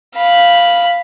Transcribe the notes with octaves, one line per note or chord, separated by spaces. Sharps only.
F5 B5